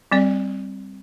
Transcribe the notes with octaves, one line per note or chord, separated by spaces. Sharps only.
G3 C4 D5